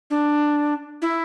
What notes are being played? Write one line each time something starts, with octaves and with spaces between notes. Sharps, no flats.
D4
E4